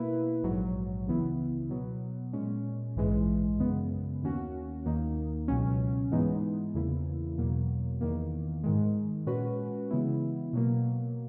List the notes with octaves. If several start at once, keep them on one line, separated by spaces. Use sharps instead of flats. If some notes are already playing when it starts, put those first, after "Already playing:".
Already playing: B2 A#3 E4 B4
A#1 G#2 F#3
C#2 C#3 E3 B3 E4
B2 F#3 B3
A#2 G#3 C#4
A#1 G#2 E3 G#3
F#2 C#3 G#3 B3
D#2 D#3 A#3 C#4 F#4
D#2 D#3 A#3 D#4
C#2 B2 F#3 C#4
G#2 E3 G#3 B3 D#4
E2 C#3 E3 A#3 E4
E2 B2 F#3 A#3
E2 D#3 A#3
G#2 D#3 G#3
A#2 G#3 C#4 F#4 B4
C#3 E3 G#3 B3 E4
B2 F#3 A#3